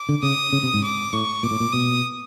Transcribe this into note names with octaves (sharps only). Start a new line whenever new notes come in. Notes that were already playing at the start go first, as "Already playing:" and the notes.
Already playing: D6
D3
C#3 D#6
C#3
C3
G#2
D6
A2 C#6
A#2 D6
A2
A#2
B2 D#6